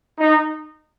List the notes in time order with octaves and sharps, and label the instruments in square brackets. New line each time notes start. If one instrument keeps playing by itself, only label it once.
[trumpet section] D#4